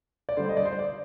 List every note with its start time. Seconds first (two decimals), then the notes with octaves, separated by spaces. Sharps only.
0.29 D5
0.37 D3 G3 C5
0.49 D#5
0.57 D5
0.65 C5
0.79 D5